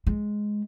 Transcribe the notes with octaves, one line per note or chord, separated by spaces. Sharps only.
G#3